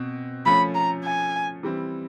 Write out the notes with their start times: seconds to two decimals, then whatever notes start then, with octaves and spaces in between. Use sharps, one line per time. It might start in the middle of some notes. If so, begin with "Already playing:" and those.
Already playing: B2 C4
0.46 F3 A3 C#4 B5
0.75 A#5
1.04 G#5
1.63 E3 G3 C4 E4